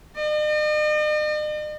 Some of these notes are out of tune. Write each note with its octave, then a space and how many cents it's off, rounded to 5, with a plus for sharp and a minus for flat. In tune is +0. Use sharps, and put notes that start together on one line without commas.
D#5 -45